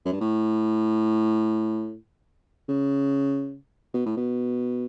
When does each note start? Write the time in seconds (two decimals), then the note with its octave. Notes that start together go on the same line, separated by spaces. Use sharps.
0.05 F#2
0.12 G2
0.21 A2
2.69 C#3
3.94 B2
4.06 A2
4.17 B2